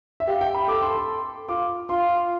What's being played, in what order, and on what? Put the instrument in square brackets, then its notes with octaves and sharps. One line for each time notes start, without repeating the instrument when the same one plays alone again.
[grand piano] E5
[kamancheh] G4 [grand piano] F5
[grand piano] G5
B5
[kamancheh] A4 [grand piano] D6
[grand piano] C6
C6
[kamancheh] F4 [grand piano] D6
[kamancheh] F4 [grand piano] C6